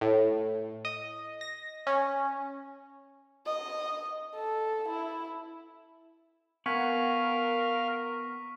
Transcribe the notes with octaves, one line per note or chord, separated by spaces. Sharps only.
A2
D#5
A#6
C#4
D#5
A4
E4
B3 A#4 F5 F#5 G#5 C#6 B6